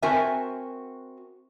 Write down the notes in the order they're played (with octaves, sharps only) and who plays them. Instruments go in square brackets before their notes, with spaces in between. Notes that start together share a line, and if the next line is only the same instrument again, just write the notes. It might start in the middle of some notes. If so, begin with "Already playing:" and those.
[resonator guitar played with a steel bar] C4 F#4 A#4 E5 G#5 A5